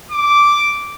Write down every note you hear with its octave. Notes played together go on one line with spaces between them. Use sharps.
D6